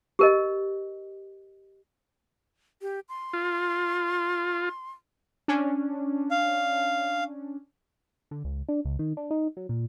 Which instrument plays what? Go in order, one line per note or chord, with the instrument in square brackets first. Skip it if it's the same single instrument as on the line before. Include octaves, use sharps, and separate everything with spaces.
[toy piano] G4 A#4 D#5
[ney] G4
C6
[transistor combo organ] F4
[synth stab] C#4 D4
[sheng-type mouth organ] F5
[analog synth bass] D3
C#2
D4
C#2
D#3
D4
D#4
F#3
A#2